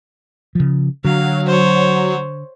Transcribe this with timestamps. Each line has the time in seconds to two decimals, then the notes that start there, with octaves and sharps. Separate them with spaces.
0.55 C#3 F3
1.05 D3 F#3 F5
1.46 C5 C#5